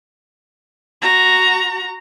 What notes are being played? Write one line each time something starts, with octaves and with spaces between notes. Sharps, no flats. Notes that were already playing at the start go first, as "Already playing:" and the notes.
F#4 A#5